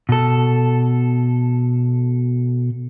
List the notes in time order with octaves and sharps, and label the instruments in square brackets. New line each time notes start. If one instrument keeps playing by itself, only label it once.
[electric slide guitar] B2 A4